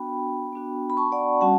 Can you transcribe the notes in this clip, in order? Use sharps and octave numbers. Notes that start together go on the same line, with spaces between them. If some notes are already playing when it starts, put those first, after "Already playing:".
Already playing: B3 D4 F#4 G5 B5
B3 D4 F#4
B5
A5 C#6
D5 F#5
G3 C#4 F#4 F#5 A5